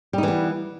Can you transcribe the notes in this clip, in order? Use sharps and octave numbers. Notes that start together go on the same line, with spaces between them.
E3 G3 B3 D#4